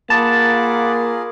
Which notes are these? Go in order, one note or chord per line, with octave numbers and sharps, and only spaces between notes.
A#3 F4 G#4 A#4 F#5 A5 B5 D6